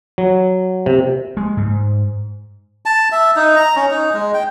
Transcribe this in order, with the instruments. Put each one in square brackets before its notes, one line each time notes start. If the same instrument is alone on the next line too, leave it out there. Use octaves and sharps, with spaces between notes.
[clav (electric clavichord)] F#3
C3
[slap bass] G#3
G#2
[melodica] A5
E5
D#4
A#5
C#4
D#4
G#3
G5